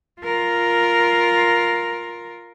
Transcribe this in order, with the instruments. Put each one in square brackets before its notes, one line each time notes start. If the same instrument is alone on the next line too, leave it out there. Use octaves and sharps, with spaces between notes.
[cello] F4 A#4